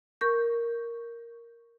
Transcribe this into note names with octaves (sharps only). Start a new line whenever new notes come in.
A#4 C#6 G6